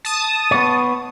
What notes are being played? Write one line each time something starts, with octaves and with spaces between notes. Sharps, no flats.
A5 D#6
B3 C#5